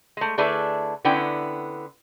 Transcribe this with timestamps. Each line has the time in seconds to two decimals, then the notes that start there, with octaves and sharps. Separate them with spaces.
0.17 G#3 A3
0.38 D3 A3 D4 E4 G#4 B4
1.05 D3 B3 C#4 E4 G5